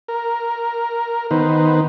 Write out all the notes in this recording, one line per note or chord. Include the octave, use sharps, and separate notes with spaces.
A#4
D#3 B3 D#4 B4 C5